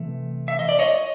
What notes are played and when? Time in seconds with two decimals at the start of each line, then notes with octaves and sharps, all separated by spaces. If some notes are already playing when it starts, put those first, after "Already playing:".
Already playing: C3 E3 A3
0.48 E5
0.59 D#5
0.69 D5
0.79 C#5 D#5